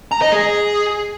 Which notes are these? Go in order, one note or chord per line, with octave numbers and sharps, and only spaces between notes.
A#5
D#5
G#4